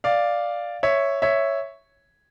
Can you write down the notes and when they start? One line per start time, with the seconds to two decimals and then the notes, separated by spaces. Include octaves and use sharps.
0.04 D5 F5
0.83 C#5 E5
1.22 C#5 E5